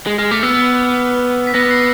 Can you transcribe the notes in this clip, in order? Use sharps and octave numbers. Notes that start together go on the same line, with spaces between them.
G#3
G#3 F6
A3 D6
B3 E6
B6
B3 A#6
C7